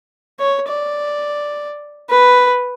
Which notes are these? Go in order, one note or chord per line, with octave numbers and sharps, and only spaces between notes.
C#5
D5
B4